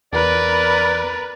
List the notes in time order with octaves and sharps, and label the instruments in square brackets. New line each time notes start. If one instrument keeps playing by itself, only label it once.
[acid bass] E2 [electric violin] A#4 B4 [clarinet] D5